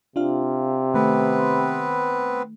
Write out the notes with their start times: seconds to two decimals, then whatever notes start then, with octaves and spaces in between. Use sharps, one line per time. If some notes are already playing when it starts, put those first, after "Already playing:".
0.16 C3 D4 F4 F5
0.94 D#3 A3 B3 C4 B4